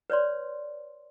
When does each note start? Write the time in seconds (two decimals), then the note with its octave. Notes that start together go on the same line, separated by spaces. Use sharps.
0.10 B4 C#5 D5 C6